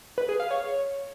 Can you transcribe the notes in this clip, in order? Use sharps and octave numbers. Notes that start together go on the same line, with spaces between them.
B4
G#4
F5
C#5